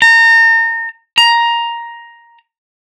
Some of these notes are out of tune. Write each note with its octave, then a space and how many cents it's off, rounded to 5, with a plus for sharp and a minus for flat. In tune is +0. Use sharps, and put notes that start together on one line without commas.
A#5 -30
A#5 +10